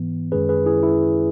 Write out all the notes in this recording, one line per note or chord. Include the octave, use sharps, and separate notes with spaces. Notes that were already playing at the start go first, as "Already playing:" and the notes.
Already playing: G#2 E3 B3
F#2 D#3 G#3 C#4 G#4 B4
G#4 B4
E4 G#4
E4